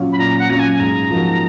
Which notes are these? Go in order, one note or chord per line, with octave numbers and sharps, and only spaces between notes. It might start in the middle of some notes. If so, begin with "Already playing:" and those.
Already playing: A#2 F#3 C#4 F4
B5
A#2 A#5
F#5
F#3 C#4 F4 A#5
G#5
G#5
G#2 A#5
F3 A#3 D#4 F#4